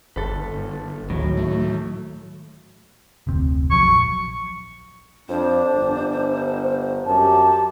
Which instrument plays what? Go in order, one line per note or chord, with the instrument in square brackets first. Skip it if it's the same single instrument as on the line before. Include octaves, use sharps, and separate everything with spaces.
[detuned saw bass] G1 [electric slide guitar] A4 B4
[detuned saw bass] D2 [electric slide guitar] A2 D#3 F#3
[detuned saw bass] A3
[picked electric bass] F1 D2 C4
[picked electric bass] A#1 F3 F#3 [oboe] C#6
[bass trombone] F2 [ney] D4 [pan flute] C5
[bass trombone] G1
[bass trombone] F#2 [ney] G4 [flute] A5